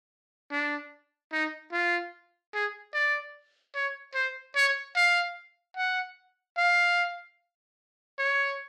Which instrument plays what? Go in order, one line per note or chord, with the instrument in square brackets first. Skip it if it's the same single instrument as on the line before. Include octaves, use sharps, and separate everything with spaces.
[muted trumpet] D4
D#4
F4
G#4
D5
C#5
C5
C#5
F5
F#5
F5
C#5